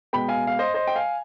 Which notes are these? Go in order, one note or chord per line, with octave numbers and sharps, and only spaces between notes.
B2 G#3 B3 G5 B5
F5 G#5
F5
C5 D#5
C5 D#5
G5
F5 G#5